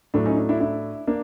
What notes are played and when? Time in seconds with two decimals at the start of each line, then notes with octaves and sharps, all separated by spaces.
0.14 A2 F#3 A3 D4
0.26 C#4 D#4
0.37 D4
0.49 D4 E4
0.60 D4 E4
1.07 A#3 D4